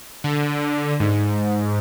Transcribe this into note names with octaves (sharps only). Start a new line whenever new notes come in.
D3
G#2